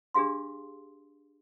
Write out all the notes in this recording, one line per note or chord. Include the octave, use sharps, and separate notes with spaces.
D4 G4 G#4 F5 C6